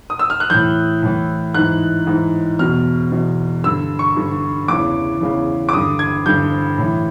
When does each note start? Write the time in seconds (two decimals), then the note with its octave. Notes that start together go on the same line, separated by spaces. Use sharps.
0.10 D#6
0.19 E6
0.30 F6
0.40 F#6
0.50 A2 E3 G6
1.03 A2 E3
1.54 G#2 E3 F#6
2.07 G#2 E3
2.59 E2 B2 F6
3.12 E2 B2
3.64 G2 D3 E6
3.99 C#6
4.16 G2 D3
4.68 E2 C#3 E3 D6
5.21 E2 C#3 E3
5.69 D6
5.73 G2 D3 D#6
5.99 G#6
6.26 G2 D3 G6
6.78 A2 E3